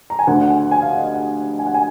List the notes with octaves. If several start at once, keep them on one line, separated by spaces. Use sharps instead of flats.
A#5
G#5
D2 D3 F#5
F#5
G#5
G#5
F5
D#5
F5
F#5
G#5
F#5
G#5